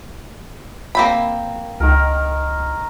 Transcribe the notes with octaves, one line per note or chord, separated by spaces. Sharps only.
A#3 C4 B5
C#2 D#3 A#4